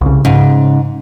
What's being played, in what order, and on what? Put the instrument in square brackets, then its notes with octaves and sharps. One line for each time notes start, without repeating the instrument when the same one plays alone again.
[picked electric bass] C2 C#3
[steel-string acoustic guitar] G#2 [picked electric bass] C#3